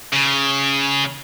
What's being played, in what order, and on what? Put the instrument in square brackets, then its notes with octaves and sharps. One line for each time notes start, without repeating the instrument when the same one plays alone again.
[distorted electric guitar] C#3